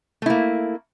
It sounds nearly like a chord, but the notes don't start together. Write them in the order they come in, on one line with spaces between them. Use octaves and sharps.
A3 E4 A#3